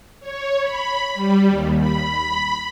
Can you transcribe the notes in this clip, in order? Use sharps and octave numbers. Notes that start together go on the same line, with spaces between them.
C#5
B5
G3
D#2
B5